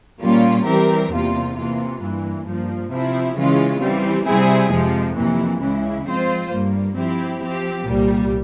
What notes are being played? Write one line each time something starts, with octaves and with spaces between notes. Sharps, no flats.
A#2 G3 A#3 C#4 F4
E3 G3 C4 G4 A#4
E2 C3 G3 A#3 F4
C3 E3 A#3 F4
G2 E3 A#3
G2 F3 A#3
C3 F3 C4 E4
C#3 E3 G#3 C#4 F4
E3 G3 C4
C3 G3 C4 E4 G#4
F2 C3 F3 G#3
F2 C3 E3 A#3
C#2 C#3 E3 G#3 E4
F3 G#3 C4 F4 C5
G2 G3 A#3
F3 C4 E4 G4
F3 C4 G4
C2 A#2 G3